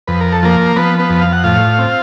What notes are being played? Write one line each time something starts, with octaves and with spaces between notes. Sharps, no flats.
F2 B4
A#4
A4
F3 A#3 A#4
F3 B3 B4
B3 B4
F2
F5
F#5
A2 F4 F5
C4